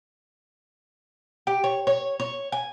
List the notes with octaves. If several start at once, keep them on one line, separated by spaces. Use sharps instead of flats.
G4
C#5
C#5
C#5
G#5